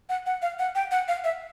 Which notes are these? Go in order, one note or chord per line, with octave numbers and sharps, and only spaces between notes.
F#5
F#5
F5
F#5
G5
F#5
F5
E5